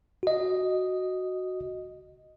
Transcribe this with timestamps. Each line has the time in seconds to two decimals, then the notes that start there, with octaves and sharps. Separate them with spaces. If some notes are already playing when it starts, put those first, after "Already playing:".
0.23 F#4 D#5